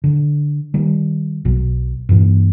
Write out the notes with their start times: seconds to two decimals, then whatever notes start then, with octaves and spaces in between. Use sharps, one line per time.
0.04 D3
0.74 D#3 G3
1.45 B1 B2
2.09 G2 A#2 E3